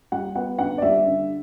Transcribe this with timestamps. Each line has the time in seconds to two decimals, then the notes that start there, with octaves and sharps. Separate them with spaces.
0.12 G3 F#5
0.35 B3 F#5
0.59 D3 F#5
0.78 D5
0.82 G3 E5
1.06 D3